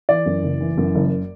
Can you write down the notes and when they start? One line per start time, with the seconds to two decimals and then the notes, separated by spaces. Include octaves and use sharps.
0.09 E3 D5
0.26 F#2
0.43 F#1
0.61 E3
0.78 F#2
0.95 F#1